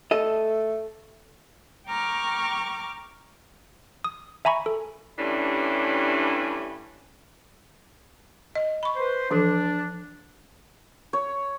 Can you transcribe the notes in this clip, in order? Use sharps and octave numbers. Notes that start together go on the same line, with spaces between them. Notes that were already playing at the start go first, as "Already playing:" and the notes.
A3 A4 D#5
G5 A#5 C#6 D6 F6
D#6
E5 G#5 A#5 B5 C#6
A4
G2 E3 G3 A3 C#4 D4
D#5
B5 C#6
B4 C5
E3 F3 D4 A4
C#5